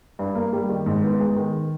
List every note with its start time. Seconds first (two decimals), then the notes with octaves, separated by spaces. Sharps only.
0.19 G2
0.35 A#3
0.53 G3
0.70 D#3
0.86 G#2
1.03 B3
1.20 G#3
1.36 D#3